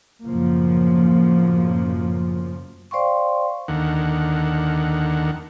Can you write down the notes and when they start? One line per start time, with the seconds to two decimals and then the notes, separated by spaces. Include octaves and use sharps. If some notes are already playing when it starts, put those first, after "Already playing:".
0.23 F#2 A2 C#3 F3 F#3 A#3
2.91 C5 D5 F5 G5 C6 C#6
3.68 D#2 D3 D#3 F#5